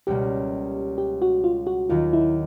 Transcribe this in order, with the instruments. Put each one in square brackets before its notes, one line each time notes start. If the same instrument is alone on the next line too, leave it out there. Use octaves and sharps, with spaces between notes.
[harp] C#2 B2 G3 A#3 [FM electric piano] G4
[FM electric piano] G4
F#4
F4
F#4
[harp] D#2 D#3 F#3 [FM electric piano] F4
[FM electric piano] E4